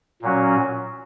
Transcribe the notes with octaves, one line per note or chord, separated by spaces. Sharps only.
A#2 F#3 C#4 F#4